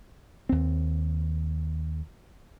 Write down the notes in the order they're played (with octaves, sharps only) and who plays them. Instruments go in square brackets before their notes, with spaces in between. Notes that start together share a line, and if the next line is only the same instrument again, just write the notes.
[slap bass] D#2 C4